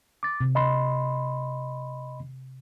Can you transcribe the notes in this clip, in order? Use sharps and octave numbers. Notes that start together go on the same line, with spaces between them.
D6 A6
C3
D#5 B5 C6